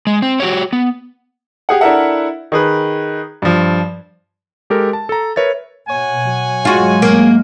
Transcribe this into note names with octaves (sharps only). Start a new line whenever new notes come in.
G#3
C4
F#4 G4 C#5
B3
G4 G#4 F#5
D4 E4 A4 A#4 E5 F#5
D#3 G#4 B4
G2 F3
G#3 G4 A4 A#4
A5
A4 A#5
A#4 B4 C#5 E5 A6
B2 C#5 F#5 G#5
F#3
G#2 F#3 G#3 F4 F#4
A#3